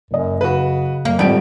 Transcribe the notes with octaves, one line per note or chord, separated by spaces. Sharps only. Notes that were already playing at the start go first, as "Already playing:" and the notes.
F#1 F#2 D#5
C#3 F#4 B4
F#2 A#3
G#1 A2 F3 G3 C4 D7